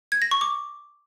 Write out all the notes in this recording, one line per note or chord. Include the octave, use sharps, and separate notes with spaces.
G#6
A#6
C#6
D6